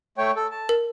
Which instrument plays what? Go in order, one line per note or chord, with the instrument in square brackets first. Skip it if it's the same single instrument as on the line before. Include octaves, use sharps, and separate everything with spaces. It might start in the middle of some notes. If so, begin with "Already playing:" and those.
[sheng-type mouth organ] A3 C#5 G5
A4
A5
[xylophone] A#4